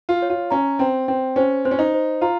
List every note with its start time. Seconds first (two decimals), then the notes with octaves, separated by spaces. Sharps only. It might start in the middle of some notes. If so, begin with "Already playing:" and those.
0.09 F4
0.22 C#5
0.30 F4
0.51 C#4 A#5
0.79 C4 G5
1.08 C4 G5
1.36 C#4 C5
1.65 C4 C5
1.71 C#4
1.79 D#4
1.94 C5
2.21 F4 A#5